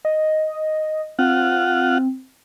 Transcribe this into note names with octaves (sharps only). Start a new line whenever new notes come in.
D#5
C4 F4 F#5